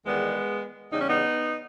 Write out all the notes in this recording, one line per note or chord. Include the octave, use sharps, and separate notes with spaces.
E2 D#3 G3 G#3 B3
E2 C#3 G3 D#4
C#4
B3 D#4